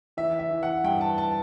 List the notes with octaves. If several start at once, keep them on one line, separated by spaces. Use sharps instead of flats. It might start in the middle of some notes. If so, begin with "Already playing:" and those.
E3 E5
E5
E3
F#5
G2 G5
A5
A5